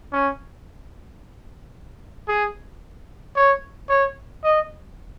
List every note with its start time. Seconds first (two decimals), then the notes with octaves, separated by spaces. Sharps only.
0.12 C#4
2.28 G#4
3.36 C#5
3.89 C#5
4.44 D#5